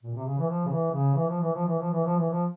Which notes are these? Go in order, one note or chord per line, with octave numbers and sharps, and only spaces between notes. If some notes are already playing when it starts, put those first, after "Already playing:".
A#2
C3
C#3
E3
F3
C#3
E3
C#3
E3
F3
E3
F3
E3
F3
E3
F3
E3
F3